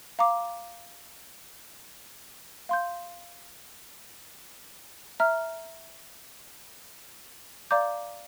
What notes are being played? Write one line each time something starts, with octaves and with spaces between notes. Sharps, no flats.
F5 A#5 D6
F5 C6 G6
E5 A#5 F6
D5 F5 A#5 D6 G6